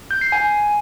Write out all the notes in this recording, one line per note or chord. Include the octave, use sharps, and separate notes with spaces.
G6
C7
G#5